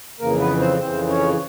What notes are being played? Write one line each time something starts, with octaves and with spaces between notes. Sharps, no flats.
F2 C#3 E3 A#3 A#4
B3 B4
C4 C5
F2 C#3 E3 C4 C5
C#4 C#5